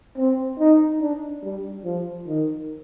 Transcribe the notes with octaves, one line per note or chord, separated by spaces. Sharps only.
C4
D#4
D4
G3
F3
D#3